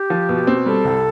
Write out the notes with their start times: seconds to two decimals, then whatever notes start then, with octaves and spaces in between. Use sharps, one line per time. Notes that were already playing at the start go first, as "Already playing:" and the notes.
Already playing: G4
0.10 F3
0.29 B2
0.47 C4
0.66 G3 A4
0.85 C2